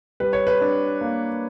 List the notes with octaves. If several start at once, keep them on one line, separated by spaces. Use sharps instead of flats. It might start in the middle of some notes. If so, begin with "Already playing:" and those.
G3 B4
C#5
B4
D4
A#3